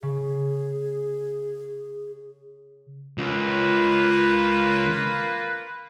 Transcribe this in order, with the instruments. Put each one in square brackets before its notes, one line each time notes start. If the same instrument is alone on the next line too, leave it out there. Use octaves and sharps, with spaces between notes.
[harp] C#3 [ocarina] G#4
[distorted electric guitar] C#2 [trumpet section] A#3 F4 B4